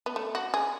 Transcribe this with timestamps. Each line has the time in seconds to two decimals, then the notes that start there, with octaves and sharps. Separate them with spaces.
0.06 B3
0.16 A3
0.35 F#4
0.54 G#4